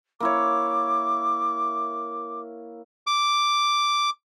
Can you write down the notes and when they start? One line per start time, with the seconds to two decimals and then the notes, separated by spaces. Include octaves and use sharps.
0.20 A#3 E4 C#5 D6
3.07 D6